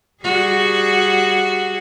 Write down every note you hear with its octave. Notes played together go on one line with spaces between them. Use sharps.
G3 F#4 G#4